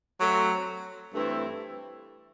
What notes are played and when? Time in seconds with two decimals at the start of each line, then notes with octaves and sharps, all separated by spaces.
0.19 F#3 A3 C4
1.13 G2 E3 A3 C4 E4